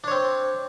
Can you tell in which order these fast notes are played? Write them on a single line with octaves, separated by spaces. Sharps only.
D4 C#5 C4